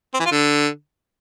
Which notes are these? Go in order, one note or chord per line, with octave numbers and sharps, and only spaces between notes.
C4
E3
F4
D3